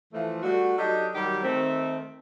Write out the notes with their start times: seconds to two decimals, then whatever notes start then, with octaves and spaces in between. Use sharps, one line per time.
0.13 E3 F3 A3
0.43 G3 A3 D4 F#4
0.78 F#3 D4 D#4 G4 A4 D#5
1.14 D#3 F#3 G3 G4
1.44 D#3 A3 C4